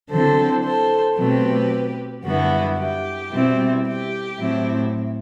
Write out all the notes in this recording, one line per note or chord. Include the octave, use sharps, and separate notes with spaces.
D3 F#3 C4 E4 A4 C5
A4 C5
B2 F#3 A3 C4 G4 B4
F#2 D3 G3 B3 E4 F#4
G4
B2 G3 C4 E4
G4
A2 F#3 C4 E4